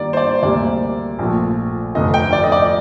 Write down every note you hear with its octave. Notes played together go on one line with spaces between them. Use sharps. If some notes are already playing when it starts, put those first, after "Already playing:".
Already playing: G2 D#3 G3 A#3 D5
C5
D5
D2 C3 G3 A#3 D5
A#1 A#2 F3 A3
F1 F2 D3 A3 D#5
G5
D5
D#5
D5